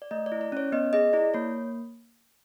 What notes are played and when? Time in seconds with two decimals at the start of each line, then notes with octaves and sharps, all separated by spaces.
0.02 D5
0.11 A3 D#5
0.26 D5
0.32 E4
0.41 D5
0.52 C#4 C#5
0.72 B3 D#5
0.93 G#4 D#5
1.13 E4 D5
1.34 A#3 C#5